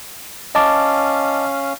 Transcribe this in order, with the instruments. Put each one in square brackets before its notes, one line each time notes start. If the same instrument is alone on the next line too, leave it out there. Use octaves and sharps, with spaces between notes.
[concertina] C#4 F5 [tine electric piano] D#5 A5 D6